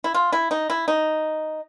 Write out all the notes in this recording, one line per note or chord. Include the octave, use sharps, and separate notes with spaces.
E4
F4
E4
D#4
E4
D#4